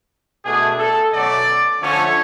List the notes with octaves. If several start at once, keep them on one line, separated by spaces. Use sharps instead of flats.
B2 A3 D4 G#4
A4
B2 F#3 A3 C#4 D5
D3 F3 A3 C#4 C#5